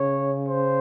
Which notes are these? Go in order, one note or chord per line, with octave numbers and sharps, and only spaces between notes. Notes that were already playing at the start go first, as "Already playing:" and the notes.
Already playing: C#3 C#5
C5